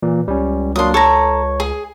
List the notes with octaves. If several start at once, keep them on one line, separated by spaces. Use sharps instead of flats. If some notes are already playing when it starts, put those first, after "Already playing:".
A#2 E3
C#2 G3 C#4
F#3 A#3 D4 C6 D#6
A4 C#5 A#5 C#6
G#4